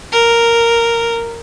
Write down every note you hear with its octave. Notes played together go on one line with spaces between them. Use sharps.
A#4